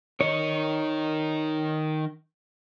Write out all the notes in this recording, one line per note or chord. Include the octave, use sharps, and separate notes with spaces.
D#3 D#4 C#5